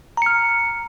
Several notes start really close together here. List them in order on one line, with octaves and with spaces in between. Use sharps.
A#5 C#7 F6